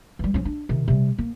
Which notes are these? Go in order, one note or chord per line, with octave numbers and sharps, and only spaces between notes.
E3 G3
F3 C#4
D4
C3 D#3
C3 G3
A#3